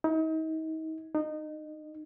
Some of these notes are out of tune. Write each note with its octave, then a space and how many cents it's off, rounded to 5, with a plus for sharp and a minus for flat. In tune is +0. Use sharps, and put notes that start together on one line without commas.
D#4 +35
D#4 -25